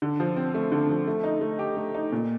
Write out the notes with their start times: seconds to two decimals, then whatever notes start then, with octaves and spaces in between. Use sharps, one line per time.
0.02 D3
0.20 F3
0.36 C4
0.54 A3
0.72 D3
0.90 F3
1.07 A3
1.24 D#4
1.41 A3
1.59 G4
1.77 A3
1.94 D#4
2.12 A#2